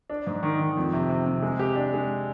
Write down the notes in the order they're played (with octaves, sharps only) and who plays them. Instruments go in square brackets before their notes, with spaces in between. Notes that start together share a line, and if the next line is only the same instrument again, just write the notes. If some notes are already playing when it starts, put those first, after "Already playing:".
[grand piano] D4
G#2
D#3
D#3
F2
C3
C3
C3
G#3
G4
D4
G#3